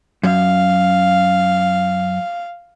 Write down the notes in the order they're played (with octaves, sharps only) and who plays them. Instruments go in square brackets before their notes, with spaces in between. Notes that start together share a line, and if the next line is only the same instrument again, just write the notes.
[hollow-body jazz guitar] F#2 [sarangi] F5